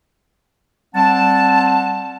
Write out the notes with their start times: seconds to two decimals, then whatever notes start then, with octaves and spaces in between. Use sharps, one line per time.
0.94 G3 C4 F#5 A5